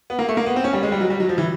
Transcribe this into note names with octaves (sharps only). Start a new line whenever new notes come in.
B3
A#3
A3
A#3
B3
C4
C#4
G3
G#3
G3
F#3
G3
F#3
F3
E3